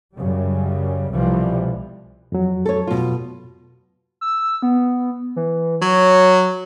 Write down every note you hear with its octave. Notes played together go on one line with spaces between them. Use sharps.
F#2 C#3 G3
C2 B2 E3 F3 G3
F2 F#3
A4 C#5
B2 F4
E6
B3
E3
F#3 C#5